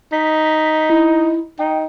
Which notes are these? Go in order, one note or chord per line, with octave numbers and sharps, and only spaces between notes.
D#4 B6
E4
D#4 G5